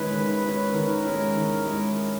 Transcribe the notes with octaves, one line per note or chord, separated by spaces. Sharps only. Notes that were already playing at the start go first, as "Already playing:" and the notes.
Already playing: D#3 G#3 C#4 E4 B4
D#3
G#3 C#4 E4
D#3 A#4
G#3 C#4 E4
D#3
G#3 C#4 E4